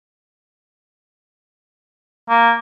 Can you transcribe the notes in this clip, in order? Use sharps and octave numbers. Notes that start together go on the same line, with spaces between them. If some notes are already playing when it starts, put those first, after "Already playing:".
A#3